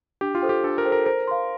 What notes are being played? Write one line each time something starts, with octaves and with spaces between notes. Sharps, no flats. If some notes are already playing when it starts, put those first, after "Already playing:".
D4 G4
F4
A4 C5 G5
G4
D4 A4
A#4
A4 C5 G5
A#4
A#4 C5
F5 C6